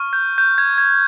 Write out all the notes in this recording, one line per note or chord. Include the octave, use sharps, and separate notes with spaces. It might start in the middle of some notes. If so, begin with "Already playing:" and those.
Already playing: C#6 F6
G6
G6
G#6
G#6